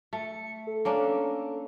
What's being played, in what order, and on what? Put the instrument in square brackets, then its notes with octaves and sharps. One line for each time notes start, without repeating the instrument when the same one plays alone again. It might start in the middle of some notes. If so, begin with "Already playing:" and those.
[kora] A3 [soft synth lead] C#7
[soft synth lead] A4
[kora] A#3 C#4 D4